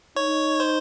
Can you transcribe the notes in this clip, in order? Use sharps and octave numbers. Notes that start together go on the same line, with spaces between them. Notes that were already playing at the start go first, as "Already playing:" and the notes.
D#4 C#5
C5